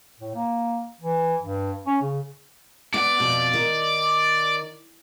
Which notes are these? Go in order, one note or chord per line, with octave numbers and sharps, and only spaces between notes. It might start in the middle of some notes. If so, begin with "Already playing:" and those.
A2
A#3
E3
G2
C#4
C#3
B3 D5 F#5
F2 B2
D#3